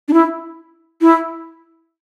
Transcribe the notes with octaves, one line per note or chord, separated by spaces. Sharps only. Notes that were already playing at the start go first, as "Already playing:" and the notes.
D4
E4
E4